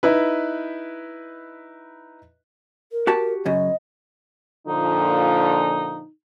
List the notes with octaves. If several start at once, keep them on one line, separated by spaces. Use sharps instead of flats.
D#4 E4 B4
A#4
F#4 G4 A5
F#2 C#3 D#5
A#2 D3 F3 D#4